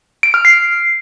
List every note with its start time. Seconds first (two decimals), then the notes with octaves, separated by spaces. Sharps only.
0.23 D7
0.34 F6
0.45 C7